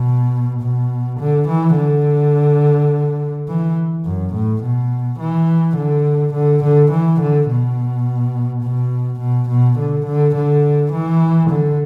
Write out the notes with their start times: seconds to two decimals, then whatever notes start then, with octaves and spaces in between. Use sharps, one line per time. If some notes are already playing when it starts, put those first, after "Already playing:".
Already playing: B2
0.62 B2
1.20 D3
1.48 E3
1.77 D3
3.48 E3
4.05 F#2
4.34 A2
4.63 B2
5.19 E3
5.77 D3
6.34 D3
6.64 D3
6.91 E3
7.21 D3
7.49 B2
8.63 B2
9.20 B2
9.49 B2
9.78 D3
10.06 D3
10.35 D3
10.92 E3
11.50 D3